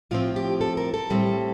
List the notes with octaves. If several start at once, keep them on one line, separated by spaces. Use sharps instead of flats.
A2 F3 C4 F4
G4
A4
A#4
A4
A2 G3 C4